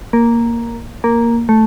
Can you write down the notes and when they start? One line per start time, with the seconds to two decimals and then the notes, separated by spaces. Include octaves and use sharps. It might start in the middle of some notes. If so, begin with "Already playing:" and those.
0.13 A#3
1.04 A#3
1.49 A3